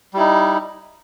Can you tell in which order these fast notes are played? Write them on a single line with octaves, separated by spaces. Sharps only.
G3 E4 D#4